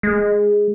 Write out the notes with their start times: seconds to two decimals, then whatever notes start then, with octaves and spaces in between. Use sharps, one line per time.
0.03 G#3